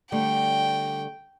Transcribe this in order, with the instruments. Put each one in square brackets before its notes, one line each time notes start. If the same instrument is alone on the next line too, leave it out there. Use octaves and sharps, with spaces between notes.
[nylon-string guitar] D3 G3 A3 [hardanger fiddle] G5